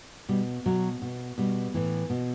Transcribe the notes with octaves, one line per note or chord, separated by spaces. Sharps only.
B2 G3
B2 F#3
B2
B2 G3
A2 E3
B2